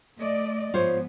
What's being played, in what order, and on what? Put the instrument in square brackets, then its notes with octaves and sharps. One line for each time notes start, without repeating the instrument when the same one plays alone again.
[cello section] A3 D5 D#5
[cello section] G#2 F3 B3 [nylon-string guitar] F4 C5 C#5